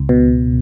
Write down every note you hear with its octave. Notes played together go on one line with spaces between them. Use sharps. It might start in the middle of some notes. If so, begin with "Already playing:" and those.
Already playing: C#2
B2